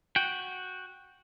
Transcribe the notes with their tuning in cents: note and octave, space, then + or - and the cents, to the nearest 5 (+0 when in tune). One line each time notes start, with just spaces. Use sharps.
F#4 -5 G5 +0